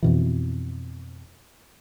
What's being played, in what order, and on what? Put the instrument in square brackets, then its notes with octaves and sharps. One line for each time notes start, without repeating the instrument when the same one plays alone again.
[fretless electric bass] F2 B2 E3